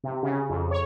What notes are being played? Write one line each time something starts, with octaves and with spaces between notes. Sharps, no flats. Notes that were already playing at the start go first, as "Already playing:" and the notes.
C3
C#3
F2
C#5